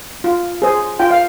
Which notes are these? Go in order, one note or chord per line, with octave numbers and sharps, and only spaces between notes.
F4
G#4 C5
F4 G5
F5